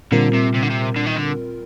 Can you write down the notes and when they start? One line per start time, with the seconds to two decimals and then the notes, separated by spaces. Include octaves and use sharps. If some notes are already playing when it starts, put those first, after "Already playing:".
0.12 A#2 D3 G3 C4 F4 A#4
0.33 C3
0.54 C3
0.62 D3
0.70 C3
0.96 D3
1.06 D#3
1.17 D3